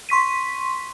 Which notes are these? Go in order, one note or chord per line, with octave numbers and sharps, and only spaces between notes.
C6 C#6 B6 D#7